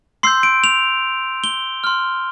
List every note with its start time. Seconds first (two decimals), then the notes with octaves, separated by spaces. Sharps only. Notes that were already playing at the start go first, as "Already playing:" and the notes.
0.23 C6 E6 G6 C7
0.43 D7
0.64 F7
1.44 G7
1.84 C6 F6